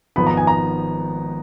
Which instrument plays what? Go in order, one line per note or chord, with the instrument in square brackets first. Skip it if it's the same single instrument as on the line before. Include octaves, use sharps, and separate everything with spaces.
[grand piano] G#1 G#2 F3 B3 D#4 [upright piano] B5
[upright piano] A#5
G#5
A#5